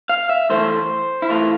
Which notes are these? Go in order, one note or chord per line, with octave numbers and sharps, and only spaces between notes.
F5
E5
A2 E3 A3 C5
E4
A2 E3 A3 F4